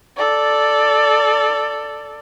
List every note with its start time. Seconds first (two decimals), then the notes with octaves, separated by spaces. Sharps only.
0.17 A4 D5